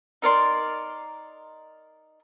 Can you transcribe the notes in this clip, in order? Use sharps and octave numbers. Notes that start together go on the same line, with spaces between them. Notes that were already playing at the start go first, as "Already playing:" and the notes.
D#4 A#4 D5 C6